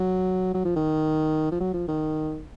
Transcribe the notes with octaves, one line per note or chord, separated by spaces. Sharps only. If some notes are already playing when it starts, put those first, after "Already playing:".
Already playing: F#3
F#3
F3
D#3
F3
F#3
F3
D#3